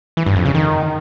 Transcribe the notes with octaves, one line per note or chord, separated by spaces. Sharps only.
E3
G2
F2
C#3
D#3